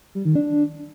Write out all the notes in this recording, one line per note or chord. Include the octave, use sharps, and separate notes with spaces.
G3
D#3
D4